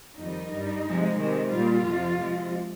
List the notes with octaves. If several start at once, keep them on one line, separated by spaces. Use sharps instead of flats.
F2 D#3 G3 D#4
G2 G3
C3 F3 G#3
C3 D#3 G#3
A#2 G3 F4
F2 C3 F3
C3 F3 G#3